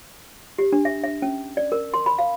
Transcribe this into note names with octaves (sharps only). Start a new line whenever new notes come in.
G4
D4
E5
E5
C#4
D5
A#4
C6
B5
F5